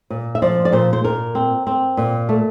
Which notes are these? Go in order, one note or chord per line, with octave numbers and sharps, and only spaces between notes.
A#2
E5
F3 D5
D5
A#2 C5
C5
A#2 A#4
C4
C4
A#2
A3